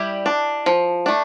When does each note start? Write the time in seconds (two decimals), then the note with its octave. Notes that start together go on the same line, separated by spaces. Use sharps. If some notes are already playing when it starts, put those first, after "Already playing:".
Already playing: G3 E4 G4
0.26 D4
0.66 F3
1.06 A3 D4